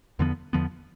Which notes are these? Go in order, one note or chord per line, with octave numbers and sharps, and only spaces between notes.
E2 D3 F3 B3
E2 D3 F3 B3